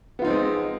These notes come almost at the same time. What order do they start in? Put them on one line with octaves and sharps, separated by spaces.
B3 F4 D#4 C4 G#3